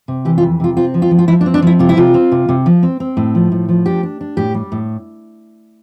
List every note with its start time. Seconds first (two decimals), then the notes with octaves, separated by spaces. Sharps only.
0.08 C3
0.25 E3 G4
0.38 F4
0.43 F2
0.60 C3 F4
0.77 C4 F4
0.94 F3
1.02 F4
1.11 F3
1.19 F4
1.28 F3 E4
1.41 D4
1.46 C4
1.54 D4
1.62 F3 E4
1.79 C3 F4
1.89 E4
1.97 C3 F4
2.14 C4
2.32 C3
2.49 C3
2.66 F3
2.83 C4
3.00 C4
3.17 A2
3.35 F3
3.52 A2
3.69 F3
3.85 D4 G4
4.03 D4
4.21 D4
4.37 A2 G4
4.54 G3
4.72 A2